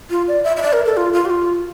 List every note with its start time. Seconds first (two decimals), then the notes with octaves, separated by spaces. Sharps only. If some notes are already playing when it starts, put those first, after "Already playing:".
0.10 F4
0.28 D5
0.44 E5
0.57 E5
0.62 D5
0.73 A#4
0.86 A4
0.97 F4
1.13 F4
1.25 G4
1.30 F4